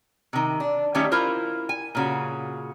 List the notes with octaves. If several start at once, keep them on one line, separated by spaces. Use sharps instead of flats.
C3 D#3
D4
D#3 G3 A3 C#4 G4 E5
E4 F4 A#4 C5
G#5
A#2 C#3 F#4